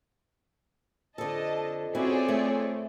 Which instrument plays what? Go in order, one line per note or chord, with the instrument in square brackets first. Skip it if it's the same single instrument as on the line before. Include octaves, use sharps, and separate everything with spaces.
[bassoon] F2 [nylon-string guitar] D3 A4 [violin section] D#5 A5
[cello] C4 [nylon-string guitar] C#4 E4 F#4 [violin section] G#4 C#5 D5
[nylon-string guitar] A3